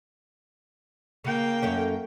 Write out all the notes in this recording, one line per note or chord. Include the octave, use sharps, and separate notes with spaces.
C#3 A#3 G5
F#2 A3 C#4